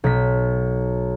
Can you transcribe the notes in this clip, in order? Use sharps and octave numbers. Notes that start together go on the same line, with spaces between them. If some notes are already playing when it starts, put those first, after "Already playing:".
B1 B6